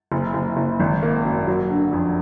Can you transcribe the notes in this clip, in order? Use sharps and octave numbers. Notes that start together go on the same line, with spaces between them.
F#1
F#1
F#1
G#1
A#3
F#2
F#3
D3
F2